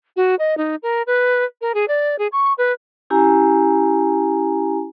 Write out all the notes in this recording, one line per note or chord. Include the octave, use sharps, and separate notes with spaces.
F#4
D#5
D#4
A#4
B4
A#4
G#4
D5
G#4
C#6
B4
C#4 E4 G4 G#5 A#5